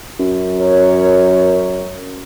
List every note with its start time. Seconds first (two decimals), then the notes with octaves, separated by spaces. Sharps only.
0.19 F#2
0.59 A#4 C#5